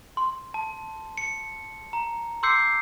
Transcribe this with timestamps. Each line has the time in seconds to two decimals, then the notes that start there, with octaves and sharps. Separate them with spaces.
0.17 C6
0.54 A5
1.17 C#7
1.93 A#5
2.43 C6 D6 E6 G6 C7 C#7